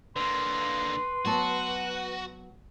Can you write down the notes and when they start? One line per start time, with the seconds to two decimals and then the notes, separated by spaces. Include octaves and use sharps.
0.16 D3 A#3 B4 C6
1.25 F#3 B3 F#4 A5